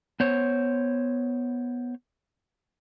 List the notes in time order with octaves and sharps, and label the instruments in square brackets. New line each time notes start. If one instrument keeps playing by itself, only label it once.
[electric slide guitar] B3 C5 C#5